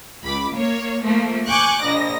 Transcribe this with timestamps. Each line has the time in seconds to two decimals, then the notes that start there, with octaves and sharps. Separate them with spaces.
0.23 C#2 B5 D6
0.53 A#3 C#5
1.04 F3 A3 A#3
1.47 G#5 C#6 D6 F#6 G6
1.82 A#1 D#5 A#6